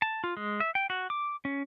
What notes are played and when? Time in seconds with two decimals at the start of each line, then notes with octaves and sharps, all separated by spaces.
0.02 A5
0.24 F4
0.37 G#3
0.60 E5
0.75 G5
0.90 F#4
1.10 D6
1.45 C#4